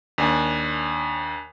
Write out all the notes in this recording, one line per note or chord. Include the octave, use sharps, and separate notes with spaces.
D#2 D4 G#5